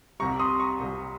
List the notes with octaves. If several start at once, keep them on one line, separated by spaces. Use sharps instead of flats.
C2 C3 G3 A#5 C#6
C6 D#6
A#5 C#6
C2 C3 G3